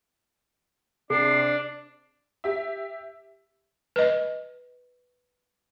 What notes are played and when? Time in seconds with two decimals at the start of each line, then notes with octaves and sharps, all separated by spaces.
1.10 C3 D4 G#4 C7
2.44 G4 E5
3.96 B4 D#5